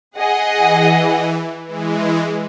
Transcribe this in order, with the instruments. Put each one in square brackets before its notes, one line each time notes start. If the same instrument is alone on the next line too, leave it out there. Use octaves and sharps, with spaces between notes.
[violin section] G#4 D#5 F#5
[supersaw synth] E3
E3 G#3